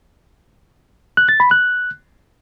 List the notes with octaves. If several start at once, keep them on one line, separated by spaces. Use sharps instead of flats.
F#6
A6
B5
F#6